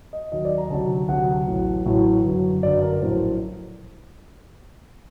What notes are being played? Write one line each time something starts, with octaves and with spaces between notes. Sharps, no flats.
D#5
D#2 D#3 F#3 D#5
D5
A#5
D2 C3 F#3 A5
D2 C3 F#3 F#5
A1 A2 F#3
A1 A2 F#3
G1 F#2 F#3
G1 F#2 F#3 D5
A#4
A#1 A2 F#3 C5